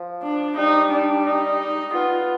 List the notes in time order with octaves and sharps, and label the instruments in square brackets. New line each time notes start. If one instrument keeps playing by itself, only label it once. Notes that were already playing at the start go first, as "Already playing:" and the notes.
Already playing: [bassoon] F3
[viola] D4
[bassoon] G3 [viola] D#4
[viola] D4
D#4
[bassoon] B3 [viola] F4